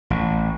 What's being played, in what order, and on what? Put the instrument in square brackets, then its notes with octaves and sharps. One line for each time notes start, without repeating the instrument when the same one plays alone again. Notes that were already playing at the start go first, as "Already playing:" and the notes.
[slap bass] A1